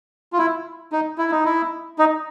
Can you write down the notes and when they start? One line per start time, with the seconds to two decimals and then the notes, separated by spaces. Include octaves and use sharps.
0.33 F4
0.38 E4
0.92 D#4
1.18 E4
1.31 D#4
1.45 E4
1.99 D#4